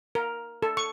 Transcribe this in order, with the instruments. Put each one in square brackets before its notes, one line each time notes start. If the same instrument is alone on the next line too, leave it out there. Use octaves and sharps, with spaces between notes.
[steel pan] A#4
A4
C#6